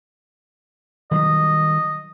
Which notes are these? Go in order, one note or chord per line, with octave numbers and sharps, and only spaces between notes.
D#3 F#3 G3 D#5